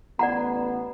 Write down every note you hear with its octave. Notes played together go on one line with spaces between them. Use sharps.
A1 B3 D5 F#5 A#5